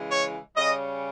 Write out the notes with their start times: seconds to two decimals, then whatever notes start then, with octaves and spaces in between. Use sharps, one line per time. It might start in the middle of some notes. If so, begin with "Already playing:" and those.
Already playing: C#3 E3 G#3
0.09 C#5
0.55 C#3 G3 C#4 D#5